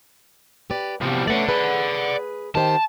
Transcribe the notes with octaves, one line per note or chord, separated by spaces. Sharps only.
G4 B4 D5
C3 E3 F3 G3 B3
A3 B3 C#4 D5 F#5
G#4 B4
D#3 G4 C5 A5